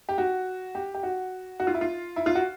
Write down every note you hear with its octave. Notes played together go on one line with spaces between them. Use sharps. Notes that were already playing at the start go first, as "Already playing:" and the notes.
G4
F#4
G4
G4
F#4
F#4
F4
E4
F4
E4
F4
F#4